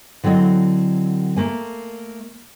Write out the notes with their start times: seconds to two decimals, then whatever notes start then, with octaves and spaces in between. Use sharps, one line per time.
0.24 D3 F#3 C4 E4 D#5
1.37 A3 A#3 G#5